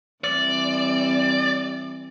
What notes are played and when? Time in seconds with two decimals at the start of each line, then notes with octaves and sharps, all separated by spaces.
0.24 E3 G3 C4 D5